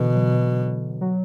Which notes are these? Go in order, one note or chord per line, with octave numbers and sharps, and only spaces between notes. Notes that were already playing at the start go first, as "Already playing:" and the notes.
Already playing: B2 D3 E3
F#3
F#3